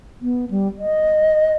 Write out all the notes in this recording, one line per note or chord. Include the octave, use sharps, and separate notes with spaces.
B3
G3
D#5